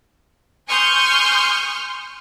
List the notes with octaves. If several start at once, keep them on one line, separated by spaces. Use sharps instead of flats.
G#5 C6 C#6 D#6 F6 G6